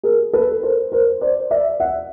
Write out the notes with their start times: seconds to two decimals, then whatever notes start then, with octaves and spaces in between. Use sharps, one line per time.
0.03 G#4 A#4
0.33 A4 B4
0.63 A#4 C5
0.92 A#4 C5
1.21 C5 D5
1.51 D5 E5
1.80 E5 F#5